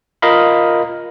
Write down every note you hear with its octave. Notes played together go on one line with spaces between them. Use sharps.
F4 A#4 D#5 F5 B5